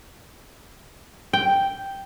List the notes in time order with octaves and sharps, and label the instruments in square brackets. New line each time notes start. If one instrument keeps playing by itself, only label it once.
[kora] G5